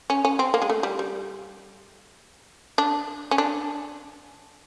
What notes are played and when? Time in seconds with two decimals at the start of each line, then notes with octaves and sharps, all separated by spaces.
0.10 C#4
0.25 C#4
0.39 C4
0.54 A#3
0.62 G#3
0.69 A3
0.83 G3
0.99 G3
2.78 D4
3.31 C#4
3.38 D4